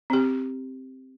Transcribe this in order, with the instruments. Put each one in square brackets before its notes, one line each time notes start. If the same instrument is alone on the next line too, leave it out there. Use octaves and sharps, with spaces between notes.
[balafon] C4 G4